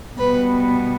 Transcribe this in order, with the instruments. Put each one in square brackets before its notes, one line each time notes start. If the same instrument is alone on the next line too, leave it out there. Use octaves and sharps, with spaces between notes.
[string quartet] B2 G3 B3 B4